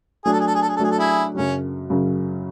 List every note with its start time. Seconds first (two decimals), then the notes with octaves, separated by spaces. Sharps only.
0.25 F#3 A3 D4 G#4
0.32 A4
0.40 G#4
0.47 A4
0.54 G#4
0.62 A4
0.69 G#4
0.76 A4
0.79 F#3 A3 D4 G#4
0.91 A4
0.98 E4 G#4
1.35 F#2 C#3 F#3 C#4
1.90 F#2 C#3 F#3